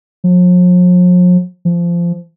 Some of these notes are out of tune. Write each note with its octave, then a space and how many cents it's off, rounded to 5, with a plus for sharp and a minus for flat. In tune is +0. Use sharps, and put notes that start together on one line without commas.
F3 +45
F3 -20